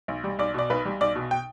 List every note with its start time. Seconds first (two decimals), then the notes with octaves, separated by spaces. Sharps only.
0.08 B1
0.24 G3
0.39 B1 D5
0.54 B2 D5
0.70 B1 B4
0.85 G3
1.01 B1 D5
1.15 B2
1.31 G5